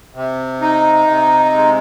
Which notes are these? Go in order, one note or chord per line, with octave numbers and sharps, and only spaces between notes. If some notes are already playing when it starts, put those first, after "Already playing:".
C3
D#4
C3
G#3